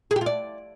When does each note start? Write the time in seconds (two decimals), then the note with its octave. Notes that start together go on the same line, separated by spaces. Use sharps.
0.11 G#4
0.16 G4
0.21 F4
0.26 D5